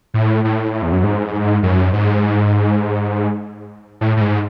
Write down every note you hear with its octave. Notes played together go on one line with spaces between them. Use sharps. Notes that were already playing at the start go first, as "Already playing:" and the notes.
A2
A2
E2
F#2
G#2
F#2
G#2
A2
A2
G#2